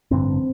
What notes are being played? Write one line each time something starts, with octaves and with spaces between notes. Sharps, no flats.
A1 G2 D3 C4